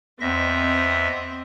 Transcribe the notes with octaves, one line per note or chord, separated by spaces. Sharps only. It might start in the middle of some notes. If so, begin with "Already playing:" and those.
E2 C4 D#5 E5 A#6